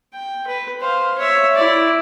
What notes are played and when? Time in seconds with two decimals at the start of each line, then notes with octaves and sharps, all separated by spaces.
0.13 G5
0.47 B4
0.81 C5 F5
1.18 C#5 E5
1.55 E4 D5